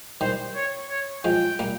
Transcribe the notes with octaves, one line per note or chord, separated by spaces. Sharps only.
D#3 G3 C5
C#5
C#5
F3 G#3 G5
G3 A#3